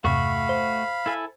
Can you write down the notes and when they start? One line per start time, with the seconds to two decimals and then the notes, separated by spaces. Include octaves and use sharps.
0.04 E2 G2 C3 A3 F#4 F5 B5 C#6
0.49 C5
1.06 E4 A4 G#5